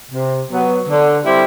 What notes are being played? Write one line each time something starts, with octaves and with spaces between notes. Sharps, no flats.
C3
F#3 B3
D3
G3 C4 E4 G4